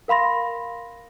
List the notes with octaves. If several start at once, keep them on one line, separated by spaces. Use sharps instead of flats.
A#4 F5 B5 C6 A#6